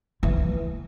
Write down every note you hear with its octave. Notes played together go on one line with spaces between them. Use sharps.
E3